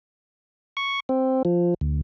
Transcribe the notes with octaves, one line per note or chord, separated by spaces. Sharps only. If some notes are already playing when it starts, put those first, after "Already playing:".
C#6
C4
F3
D2